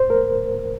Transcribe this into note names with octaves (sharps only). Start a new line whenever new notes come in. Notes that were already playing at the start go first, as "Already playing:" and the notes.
Already playing: C5
A#4